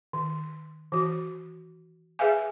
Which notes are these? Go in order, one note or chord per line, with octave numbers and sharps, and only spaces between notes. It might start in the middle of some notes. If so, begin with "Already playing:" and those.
D#3
E3 F#4
G#4 B4 E5 F5 G#5